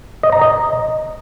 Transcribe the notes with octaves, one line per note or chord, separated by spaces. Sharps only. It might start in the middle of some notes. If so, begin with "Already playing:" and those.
D#5
A#5
D#5